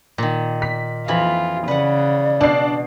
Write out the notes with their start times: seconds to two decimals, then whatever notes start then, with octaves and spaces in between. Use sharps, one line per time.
0.18 A#2 D#3
0.62 B6
1.08 F2 E3 F4 B5
1.68 C#3 B4 D5 F#5
2.41 B2 D4 C7